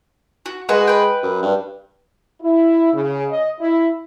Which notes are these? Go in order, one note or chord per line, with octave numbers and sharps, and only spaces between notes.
F#4
G#3 F#4 B4
B4 G5
F#2
G2
E4
C#3
D#5
E4